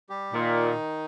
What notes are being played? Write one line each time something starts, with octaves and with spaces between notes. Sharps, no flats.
G3 G4
A#2 D#3 D#4